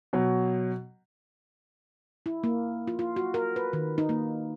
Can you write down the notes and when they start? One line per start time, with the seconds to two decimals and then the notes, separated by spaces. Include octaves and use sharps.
0.13 B2 F#3
2.26 E4
2.44 A#3
2.87 F4
2.99 F4
3.16 F#4
3.34 A#4
3.56 B4
3.73 D#3
3.98 D#4
4.09 A#3